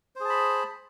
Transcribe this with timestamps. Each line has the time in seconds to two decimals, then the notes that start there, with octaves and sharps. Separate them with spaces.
0.16 C5
0.20 G#4
0.25 A5
0.30 B5